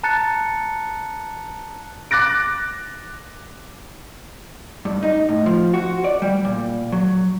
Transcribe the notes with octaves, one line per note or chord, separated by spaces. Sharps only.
A5 A#5 F#6 A6 C#7
D6 F#6 A6 A#6 D7
G2
D#4
A2
F3
F#4
D5
G3
A#2
F#3